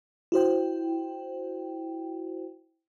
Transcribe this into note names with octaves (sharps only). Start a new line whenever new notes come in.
E4 F#4 C5 G5